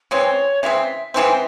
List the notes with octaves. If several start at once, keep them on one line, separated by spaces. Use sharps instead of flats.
C#3 E3 G#3 C4 C#5
C#3 E3 G#3 C4 E5
C#3 E3 G#3 C4